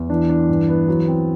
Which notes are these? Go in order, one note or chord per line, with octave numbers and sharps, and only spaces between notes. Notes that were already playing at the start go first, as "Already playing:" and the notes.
Already playing: E2
E3 D4
D4
G2
B3
F#3
C4